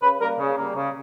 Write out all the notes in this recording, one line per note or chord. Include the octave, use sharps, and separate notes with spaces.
C#3 B4
G3 A#3 A#4
C#3
G3 A#3
C#3